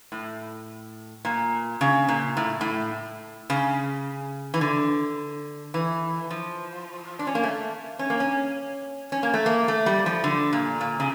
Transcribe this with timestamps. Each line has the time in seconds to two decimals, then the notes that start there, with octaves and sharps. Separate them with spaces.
0.12 A2
1.25 A#2
1.81 C#3
2.08 A#2
2.37 A2
2.61 A2
3.50 C#3
4.54 E3
4.61 D3
5.74 E3
6.30 F3
7.19 D4
7.27 C#4
7.35 A#3
7.43 A3
7.99 C#4
8.10 A#3
8.20 C#4
9.12 C#4
9.23 A#3
9.34 A3
9.46 A#3
9.68 A3
9.86 G3
10.06 F3
10.24 D3
10.53 A#2
10.81 A#2
11.00 C#3